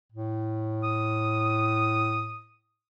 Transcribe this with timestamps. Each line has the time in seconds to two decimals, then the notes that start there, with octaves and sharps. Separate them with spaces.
0.12 A2
0.84 D#6